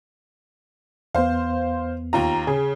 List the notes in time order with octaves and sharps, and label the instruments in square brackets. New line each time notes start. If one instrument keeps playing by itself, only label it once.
[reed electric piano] E2 B3 [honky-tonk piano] C5 F5
[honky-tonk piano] D#2 F4 A#5
[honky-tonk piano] C#3 [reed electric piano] G#4